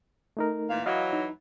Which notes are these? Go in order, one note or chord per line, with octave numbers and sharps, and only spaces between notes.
A3 D#4 A#4
A#2 E3 F5
E3 F#3 D#5 F5
D#4